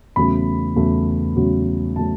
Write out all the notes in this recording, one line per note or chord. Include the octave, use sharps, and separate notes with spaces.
E2 C#3 F#3 A3 B5
E2 C#3 F#3 A3
E2 C#3 F#3 A3
C#3 F#3 A3 A5